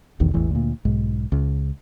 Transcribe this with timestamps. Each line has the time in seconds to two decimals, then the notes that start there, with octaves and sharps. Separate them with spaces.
0.20 F1 B1 E2 D#3
0.34 A1 E2 A2 E3
0.51 D2 A#2
0.85 B1 G#2
1.32 C#2